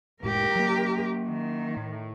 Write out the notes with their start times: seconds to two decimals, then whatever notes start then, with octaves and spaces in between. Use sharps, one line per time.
0.23 F1 A2 G#3 G4 A#4
0.56 F#3 A#3
1.28 D#3
1.77 A2